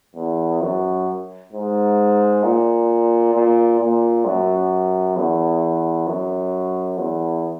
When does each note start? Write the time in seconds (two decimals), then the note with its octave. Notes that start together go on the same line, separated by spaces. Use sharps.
0.16 E2
0.61 F#2
1.52 G#2
2.43 A#2
3.34 A#2
3.80 A#2
4.25 F#2
5.16 E2
6.07 F#2
6.98 E2